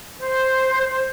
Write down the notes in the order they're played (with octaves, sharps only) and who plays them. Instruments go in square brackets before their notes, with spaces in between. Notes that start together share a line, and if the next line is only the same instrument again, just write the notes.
[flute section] C5